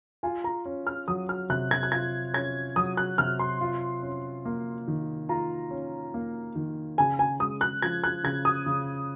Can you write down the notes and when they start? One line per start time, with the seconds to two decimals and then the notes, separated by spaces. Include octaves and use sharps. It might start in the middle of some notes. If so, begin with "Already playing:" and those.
0.23 F4 G#5
0.44 A#5
0.65 C#4
0.87 F6
1.08 F#3 D#6
1.29 F6
1.50 C3 F#6
1.71 G#6
1.83 F#6
1.92 F4 G#6
2.34 C#4 G#6
2.76 F#3 D#6
2.97 F#6
3.18 C3 F6
3.39 C6
3.61 F4
4.02 C#4
4.45 A#3
4.88 D#3
5.29 F4 A#5
5.71 C#4
6.14 A#3
6.55 D#3
6.98 C#3 G#5
7.19 G#5
7.39 G#3 D#6
7.61 F#6
7.82 F3 G#6
8.04 F#6
8.24 C#3 G#6
8.45 D#6
8.66 C#3